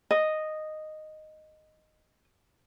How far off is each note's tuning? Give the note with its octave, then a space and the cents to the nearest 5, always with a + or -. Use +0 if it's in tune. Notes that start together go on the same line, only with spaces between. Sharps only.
D#5 -5